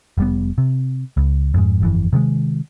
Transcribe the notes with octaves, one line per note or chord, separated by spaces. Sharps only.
F1 G3 B3
C3
C#2
F2 G#2
G1 F2 E3
C3 D#3 G3 G#3